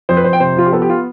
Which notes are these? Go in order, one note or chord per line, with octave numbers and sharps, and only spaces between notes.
F2 C5
B4
F2 C5
G5
C3 C5
F3 F4
G4
B3 A4
G4
F4